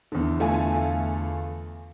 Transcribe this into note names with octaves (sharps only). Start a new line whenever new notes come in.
E2 D3
A3 F4 G#5